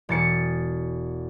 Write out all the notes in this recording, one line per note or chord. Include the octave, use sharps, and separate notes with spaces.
E1 A6 C#7